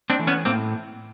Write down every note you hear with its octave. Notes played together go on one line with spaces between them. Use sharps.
C4 D4
E3 A3
B3 C#4
A2 A#3 C4